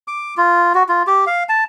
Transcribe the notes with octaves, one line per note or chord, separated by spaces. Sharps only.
D6
F4
F#4
F4
G4
F5
A5